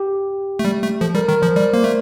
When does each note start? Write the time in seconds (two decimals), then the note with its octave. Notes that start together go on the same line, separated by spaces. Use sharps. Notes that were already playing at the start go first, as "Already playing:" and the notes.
Already playing: G4
0.59 A3
0.65 G3
0.83 A3
1.01 F3 A4
1.15 G3 A#4
1.28 D#3 A#4
1.42 F3 C5
1.56 G3 D5
1.73 A#3 C5
1.84 A3